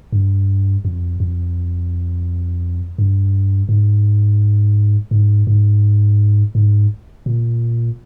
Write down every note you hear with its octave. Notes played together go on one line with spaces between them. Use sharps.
G2
F2
F2
G2
G#2
G#2
G#2
G#2
A#2